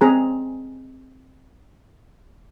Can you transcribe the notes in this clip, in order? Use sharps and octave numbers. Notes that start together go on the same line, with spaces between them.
C4 G#4 A#5